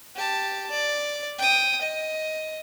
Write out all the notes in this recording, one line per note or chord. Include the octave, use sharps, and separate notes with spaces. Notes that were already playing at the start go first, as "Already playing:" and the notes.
G4 A5
D5
G5 D#6
D#5